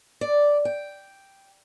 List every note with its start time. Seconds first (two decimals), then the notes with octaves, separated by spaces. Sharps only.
0.21 D5
0.65 G5